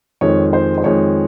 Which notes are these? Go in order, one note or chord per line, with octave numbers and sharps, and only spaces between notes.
F2 D#3 G#3 C#5
C5
C5
F2 D#3 G#3 C#5